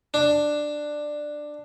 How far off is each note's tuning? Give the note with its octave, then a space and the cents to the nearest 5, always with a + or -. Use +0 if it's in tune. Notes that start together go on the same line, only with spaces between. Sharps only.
D4 +10